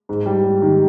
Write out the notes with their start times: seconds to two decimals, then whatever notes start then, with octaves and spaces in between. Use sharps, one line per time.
0.09 G#2
0.26 G3
0.44 G3
0.62 D#3